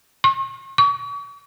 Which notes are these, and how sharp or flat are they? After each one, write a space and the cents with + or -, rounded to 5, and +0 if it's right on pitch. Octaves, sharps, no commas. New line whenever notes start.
C#6 -40
C#6 +45